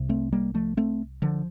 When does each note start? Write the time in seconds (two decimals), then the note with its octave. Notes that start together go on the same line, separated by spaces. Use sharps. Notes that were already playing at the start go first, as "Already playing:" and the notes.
Already playing: C2 C3
0.09 A3 C4
0.32 G3 A#3
0.54 F3 A3
0.77 A3 C4
1.22 D3 F3